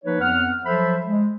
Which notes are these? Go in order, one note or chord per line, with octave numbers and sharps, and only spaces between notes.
F3 A#3 D#4 B4 C#5
F2 B3 F#5 F6
F3 F#3 A4 C5 E5 B5
G#3